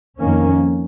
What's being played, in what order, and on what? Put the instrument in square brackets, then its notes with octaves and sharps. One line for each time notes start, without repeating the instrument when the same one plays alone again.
[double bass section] F2 D#3 A#3 C#4